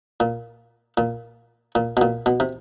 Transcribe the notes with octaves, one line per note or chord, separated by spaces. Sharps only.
A#2
A#2
A#2
B2
A#2
B2
C3